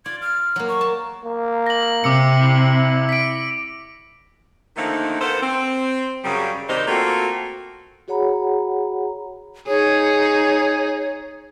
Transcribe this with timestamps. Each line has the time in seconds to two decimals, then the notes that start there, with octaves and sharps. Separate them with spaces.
0.06 F4 D5 G#6
0.22 F6
0.56 F#3 A#3
0.69 C#6
0.81 A5
1.25 A#3
1.67 A#6 F#7
2.04 C3 D6 E6 C#7
2.41 E4
3.09 B6 D7
4.77 D3 D#3 F3 A3 A#3 D#4
5.20 A#3 B3 A4 C5
5.42 C4
6.24 F#2 C#3 G3
6.69 C3 D#3 G3 D#4 C5
6.88 A3 A#3 C4 F4 F#4 A4
8.08 F#4 G#4 C#5 F#5 A#5 B5
9.68 D#4 G#4 C#5